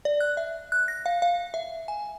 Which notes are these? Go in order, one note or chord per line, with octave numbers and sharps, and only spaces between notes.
D5
F#6
E5
F#6
A#6
F5
F5
E5
G#5